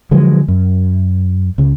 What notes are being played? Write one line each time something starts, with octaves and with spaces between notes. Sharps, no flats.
D3 F3 F#3 G#3
F#2
C#2 C#3